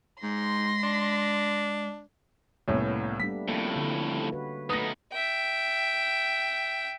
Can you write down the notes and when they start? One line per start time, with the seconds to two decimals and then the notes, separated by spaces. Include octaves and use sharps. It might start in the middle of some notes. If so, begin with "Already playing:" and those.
0.23 G#2 G#3 C6 A#6
0.83 D4
2.68 C2 A2 A#3 B3 C#4
3.20 G3 A3 D4 B6
3.48 F2 A2 A#3 C#4
3.76 D3 C#5
4.32 F#4 B4
4.70 A3 B3 D#4 B4 D#6 A#6
5.12 E5 G5